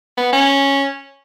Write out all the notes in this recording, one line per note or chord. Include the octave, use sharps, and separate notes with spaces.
B3
C#4